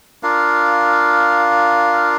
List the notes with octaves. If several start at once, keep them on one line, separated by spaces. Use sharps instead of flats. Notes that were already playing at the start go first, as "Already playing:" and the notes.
D4 F4 A#4 F5